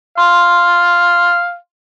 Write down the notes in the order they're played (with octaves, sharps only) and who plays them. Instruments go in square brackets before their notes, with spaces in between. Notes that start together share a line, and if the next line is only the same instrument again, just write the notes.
[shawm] F5 [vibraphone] C6